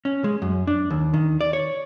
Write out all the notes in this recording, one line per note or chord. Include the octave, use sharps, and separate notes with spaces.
C#4
G#3
F#2
D4
D#2
D#3
D5
C#5